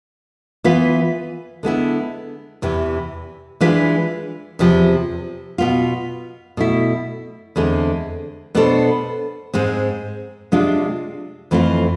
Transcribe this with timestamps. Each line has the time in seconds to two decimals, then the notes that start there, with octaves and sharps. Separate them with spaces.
0.64 E3 B3 F4 B4
1.63 D3 G#3 B3 E4
2.62 E2 C3 E3
3.61 E3 G#3 D4 F4 B4
4.59 E2 C3 F3
5.58 B2 B3 F4
6.57 B2 A3 E4
7.56 E2 D3 G#3 C4
8.55 B2 B3 D4 A4 C5
9.54 G#2 G#3 C4
10.52 C3 G#3 D4 F4
11.51 F2 E3 A3 C4 F4